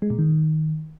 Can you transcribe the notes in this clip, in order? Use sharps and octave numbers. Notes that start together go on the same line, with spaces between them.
G#3
A#2
D#3